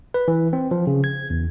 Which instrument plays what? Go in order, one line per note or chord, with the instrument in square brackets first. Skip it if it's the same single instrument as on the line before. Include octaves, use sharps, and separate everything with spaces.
[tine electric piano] B4
E3
C4
F3
C#3
G#6
E2